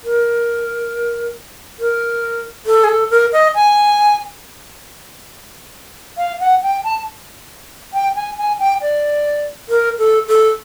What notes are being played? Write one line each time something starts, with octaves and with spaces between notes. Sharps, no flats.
A#4
A#4
A4
G#4
A4
A#4
D#5
G#5
F5
F#5
G5
A5
G5
G#5
G#5
G5
D5
A#4
A4
A4